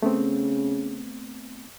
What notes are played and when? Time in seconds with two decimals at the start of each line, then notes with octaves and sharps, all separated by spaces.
0.02 C#3 A3 B3 C4